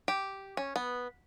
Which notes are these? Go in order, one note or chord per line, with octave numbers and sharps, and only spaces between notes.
G4
C#4
B3